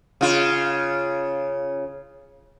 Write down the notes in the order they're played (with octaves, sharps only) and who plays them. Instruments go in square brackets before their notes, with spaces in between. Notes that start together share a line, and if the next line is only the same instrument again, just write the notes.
[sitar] C#3 F4